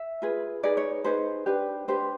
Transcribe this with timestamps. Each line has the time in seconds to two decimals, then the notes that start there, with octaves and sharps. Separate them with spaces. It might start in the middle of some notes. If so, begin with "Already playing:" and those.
Already playing: E5
0.22 F4 G#4 B4
0.63 D#4 G#4 B4 D5
0.77 C#5
1.05 D#4 G#4 B4 C5
1.46 D4 G4 B4
1.88 D4 G4 B4 C5